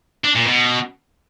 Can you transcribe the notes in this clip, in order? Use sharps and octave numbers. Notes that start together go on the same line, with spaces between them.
D4
A#2
B2